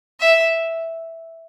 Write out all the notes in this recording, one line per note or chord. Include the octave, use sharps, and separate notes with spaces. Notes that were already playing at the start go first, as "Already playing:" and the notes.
E5